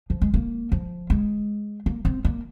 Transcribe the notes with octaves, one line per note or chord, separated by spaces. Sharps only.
F3
G#3
A#3
F3
G#3
A#3
C4
A#3